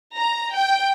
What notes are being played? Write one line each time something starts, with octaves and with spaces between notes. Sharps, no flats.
A#5
G5